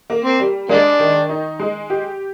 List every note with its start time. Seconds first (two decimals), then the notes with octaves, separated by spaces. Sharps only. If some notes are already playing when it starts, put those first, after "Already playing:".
0.10 A#3
0.25 C4
0.40 G3
0.69 G#3 A#3 D4
0.99 D#3
1.29 D#4
1.60 G#3
1.90 G4